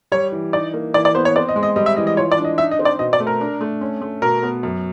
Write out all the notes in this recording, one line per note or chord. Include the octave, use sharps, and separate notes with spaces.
G3 C#5
E3
D#4 D5
A#3
E3 D5
D5
B3 C5
C#5
C4 D5
D#5
G#3
D#5
G3 D#5
E5
E3 D#5
D#5
F4 C#5
D5
D4
D#5
D#4 E5
D#5
C4
D5
B2 D#5
D5
A3
A#4
D4
A3
C#4
A3
B2 A#4
B3
F#2